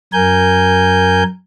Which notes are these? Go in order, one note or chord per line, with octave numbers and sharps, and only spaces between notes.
F#2 A#4 G#5 G6